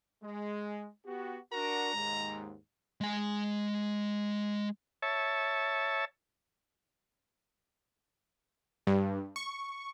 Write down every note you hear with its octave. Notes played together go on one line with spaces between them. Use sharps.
G#3
B3 F#4 G4
D4 F#4 A#4 A#5
D#2 G#2 G#3
G#3 G#5
C#5 E5 A5
G2
C#6